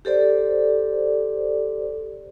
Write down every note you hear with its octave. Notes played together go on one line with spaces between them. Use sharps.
G4 A4 C5 D5